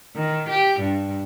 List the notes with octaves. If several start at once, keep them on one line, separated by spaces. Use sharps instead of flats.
D#3
G4
G2